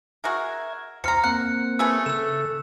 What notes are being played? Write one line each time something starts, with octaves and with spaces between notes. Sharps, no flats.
F#4 G#4 A#4 E5 G#6
E2 C3 A#5 F6 C#7
A#3 C4 F#5 F#6 C#7
A3 G#4 B4 E6
C#3 A4 E6 E7